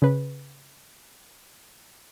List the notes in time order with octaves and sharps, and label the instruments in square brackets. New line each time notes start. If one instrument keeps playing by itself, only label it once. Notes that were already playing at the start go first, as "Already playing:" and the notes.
[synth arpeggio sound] C#3 B4